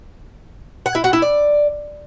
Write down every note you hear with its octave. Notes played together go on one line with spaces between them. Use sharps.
F#5
E4
F#4
E4
D5